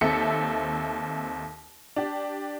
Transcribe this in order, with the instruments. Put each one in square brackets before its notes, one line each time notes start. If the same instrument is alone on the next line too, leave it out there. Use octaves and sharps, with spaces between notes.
[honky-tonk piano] D#2 C4 A4 E5 C#7
D4 G4